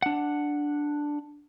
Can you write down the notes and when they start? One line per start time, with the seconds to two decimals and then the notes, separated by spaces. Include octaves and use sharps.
0.02 D4 F#5